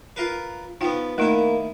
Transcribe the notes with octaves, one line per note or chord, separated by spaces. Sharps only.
F4 A#4 B4
F3 B3 D#4 G5
D#3 A3 A#3 D#4 E4